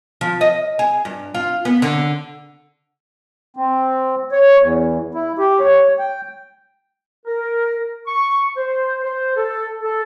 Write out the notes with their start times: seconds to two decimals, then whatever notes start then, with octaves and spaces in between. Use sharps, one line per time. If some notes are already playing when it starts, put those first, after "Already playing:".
0.21 F3
0.41 D#5
0.79 G#4
1.05 G2
1.35 F4
1.65 B3
1.82 D3
3.57 C4
4.32 C#5
4.61 E2
5.14 E4
5.38 G4
5.60 C#5
5.99 G5
7.26 A#4
8.07 C#6
8.56 C5
9.03 C5
9.36 A4
9.82 A4